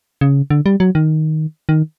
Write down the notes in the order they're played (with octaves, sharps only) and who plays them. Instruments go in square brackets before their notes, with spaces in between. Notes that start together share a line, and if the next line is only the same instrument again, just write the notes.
[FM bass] C#3
D3
G3
F#3
D#3
D#3